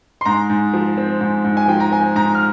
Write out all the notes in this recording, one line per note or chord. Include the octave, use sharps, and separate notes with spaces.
C6
G#2 A#5
G#2
F3
C4
G#2
G#2
G#5
F3 G5
A#5
C4 G#5
G#2 A#5
F6